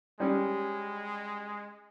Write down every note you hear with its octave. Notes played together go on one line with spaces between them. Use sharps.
G3 G#3 C#4